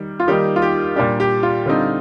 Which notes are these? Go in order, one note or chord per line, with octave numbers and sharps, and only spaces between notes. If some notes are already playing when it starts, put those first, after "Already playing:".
Already playing: D#3 G3
F4
D#3 G3 A#3 D#4 G4
F4
G4
A#2 G3 D4 G4
G4
F4
D3 G3 C4 D#4